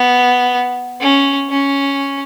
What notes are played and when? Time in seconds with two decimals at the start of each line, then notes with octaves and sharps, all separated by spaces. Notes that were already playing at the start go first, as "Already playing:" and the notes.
Already playing: B3
1.01 C#4
1.50 C#4